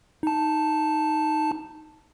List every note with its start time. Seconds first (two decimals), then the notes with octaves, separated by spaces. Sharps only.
0.23 D#4 A5